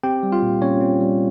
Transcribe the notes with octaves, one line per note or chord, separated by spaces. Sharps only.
C4 G4 G5
G3
F4 F5
A#2
A#2 C#4 C#5
C4
G3